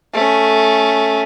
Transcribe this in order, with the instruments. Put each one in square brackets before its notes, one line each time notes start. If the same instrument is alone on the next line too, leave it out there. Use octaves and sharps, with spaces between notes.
[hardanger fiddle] A3 C#4